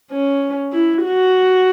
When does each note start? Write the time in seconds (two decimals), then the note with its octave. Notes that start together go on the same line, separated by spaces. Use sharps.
0.12 C#4
0.73 E4
1.04 F#4